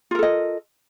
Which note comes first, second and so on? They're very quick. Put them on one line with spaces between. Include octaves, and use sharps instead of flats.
F4 A#4 A4 D#5